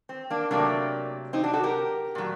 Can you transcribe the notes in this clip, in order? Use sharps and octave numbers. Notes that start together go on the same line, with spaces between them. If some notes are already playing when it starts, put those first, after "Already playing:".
C4
A#3 D4
C3 F#3 A3 A#3 D4
C4 D#4
D4 F#4
F#4 A4
G4 A#4
A#2 F#3 A3